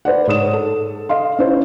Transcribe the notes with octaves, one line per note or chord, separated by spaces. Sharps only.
B4 C5 D5 F#5
G#2 C#5 D#6 E7
A4
D#5 F5 C6
C#4 E4 C5